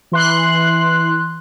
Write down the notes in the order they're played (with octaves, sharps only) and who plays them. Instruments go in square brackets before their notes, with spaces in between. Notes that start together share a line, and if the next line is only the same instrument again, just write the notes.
[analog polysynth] E3 C6 F#6